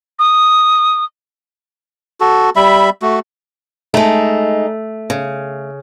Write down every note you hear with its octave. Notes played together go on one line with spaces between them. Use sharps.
D#6
F#4 A4
G3 E5 B5
A3 F#4
G#3 A3 D#4
C#3